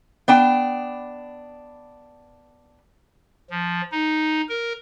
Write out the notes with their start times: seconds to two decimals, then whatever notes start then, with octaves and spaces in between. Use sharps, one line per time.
0.28 B3 D4 G5
3.50 F3
3.92 D#4
4.49 A#4